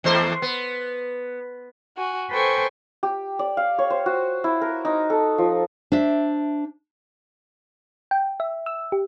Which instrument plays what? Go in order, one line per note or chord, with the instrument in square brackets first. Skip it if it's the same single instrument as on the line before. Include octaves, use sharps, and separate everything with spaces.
[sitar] E2 A3 C5
B3
[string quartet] F#4 G#5
A4 B4 C5 G5 G#5 C#6
[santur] G4
D5
F5
C#5
C5
F#4
E4
A#4
D#4
A4
F3
[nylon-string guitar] D4 C5 E5
[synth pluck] G5
E5
E6
G4